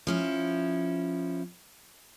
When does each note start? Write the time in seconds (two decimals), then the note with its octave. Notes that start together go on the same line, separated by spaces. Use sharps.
0.07 F3 C#4 E4